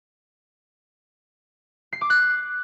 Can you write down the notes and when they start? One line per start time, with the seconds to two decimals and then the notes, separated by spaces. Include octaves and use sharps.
1.93 C7
2.01 D6
2.10 F#6